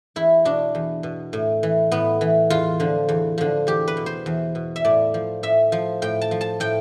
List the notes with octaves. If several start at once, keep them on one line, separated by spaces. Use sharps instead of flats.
E2 E4
B2 D4
E2
B2
A2
E3
A2 B3
E3
E2 F4
D3 F3
E2
D3 F3
E2 G4
B4
B2
C5
E2
B2
E5
A2 D5
F3
A2 E5
F3
A2 G5
A5
F3
A5
A2 G5